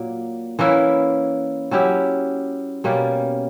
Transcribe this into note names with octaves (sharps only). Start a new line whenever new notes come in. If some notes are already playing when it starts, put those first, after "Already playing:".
Already playing: A#2 F#3 A#3
E3 A#3 C#4 E4
F#3 C#4 E4 G4
B2 G3 A#3 C#4